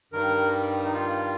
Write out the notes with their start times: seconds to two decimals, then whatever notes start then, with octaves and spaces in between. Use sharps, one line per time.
0.12 G2 D#3 G3 A#4
0.85 D#4
0.93 F4